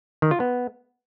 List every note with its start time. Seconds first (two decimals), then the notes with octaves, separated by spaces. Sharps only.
0.22 D#3
0.31 F4
0.40 B3